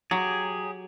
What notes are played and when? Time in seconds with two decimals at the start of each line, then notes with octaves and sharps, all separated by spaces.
0.11 F#3 G4 G#4